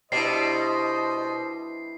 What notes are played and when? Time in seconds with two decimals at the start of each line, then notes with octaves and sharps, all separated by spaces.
0.12 B2 G3 D4 E4 C5 D#5 C7